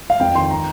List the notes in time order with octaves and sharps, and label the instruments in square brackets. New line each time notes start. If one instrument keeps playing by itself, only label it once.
[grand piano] F5
F2 G5
D#3 C6
A#5